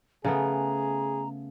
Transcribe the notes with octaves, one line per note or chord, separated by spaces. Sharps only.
C#3 A3 B3 G#4 A#5